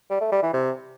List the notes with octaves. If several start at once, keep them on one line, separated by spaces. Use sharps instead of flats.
G3
A3
G3
E3
C3